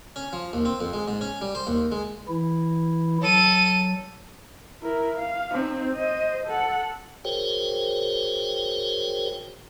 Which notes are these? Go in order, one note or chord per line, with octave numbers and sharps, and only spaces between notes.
C#4
F3
D#2
C4
F2
G#3
G#2
C#4
G3
C5
D#2
G#3
E3 E4
F#3 A4 D#7
E4 A#4
F5
C4 D#4
C5 D#5
A4 F#5
F#4 G#4 A#4 C5 C#5 G5